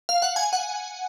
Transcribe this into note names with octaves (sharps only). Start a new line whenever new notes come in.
F5
F#5
G#5
F#5